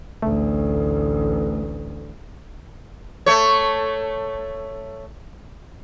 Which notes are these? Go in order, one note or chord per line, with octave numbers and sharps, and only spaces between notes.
A1 D2 A3
A3 C#5